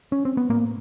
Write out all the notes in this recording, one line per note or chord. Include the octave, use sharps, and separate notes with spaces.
C#4
C4
B3
A2 A#3